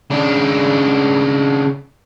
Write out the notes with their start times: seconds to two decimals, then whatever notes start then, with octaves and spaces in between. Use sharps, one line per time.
0.10 C#3 D4